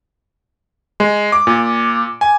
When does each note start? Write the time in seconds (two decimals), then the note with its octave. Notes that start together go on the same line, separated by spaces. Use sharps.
1.00 G#3
1.32 D6
1.47 A#2
2.21 G#5